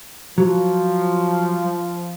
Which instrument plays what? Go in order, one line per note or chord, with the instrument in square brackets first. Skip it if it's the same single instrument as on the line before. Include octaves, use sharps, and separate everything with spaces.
[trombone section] F3 [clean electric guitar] F#3